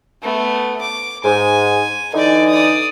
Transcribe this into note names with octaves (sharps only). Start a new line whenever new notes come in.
A3 B3
D6
G#2 G#5
D3 E3 D#4 D5 G#5
D5 D#6